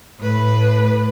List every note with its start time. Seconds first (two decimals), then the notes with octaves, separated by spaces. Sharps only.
0.20 A2 B4